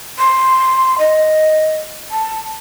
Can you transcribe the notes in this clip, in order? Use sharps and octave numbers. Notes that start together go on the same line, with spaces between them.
C6
D#5
A5